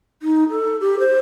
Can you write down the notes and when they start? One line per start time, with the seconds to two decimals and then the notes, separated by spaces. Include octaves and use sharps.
0.22 D#4
0.50 A4
0.80 G4
0.99 C5